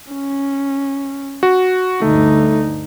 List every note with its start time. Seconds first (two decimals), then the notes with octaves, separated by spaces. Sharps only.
0.13 C#4
1.43 F#4
2.02 D2 G2 D3 A3 D#4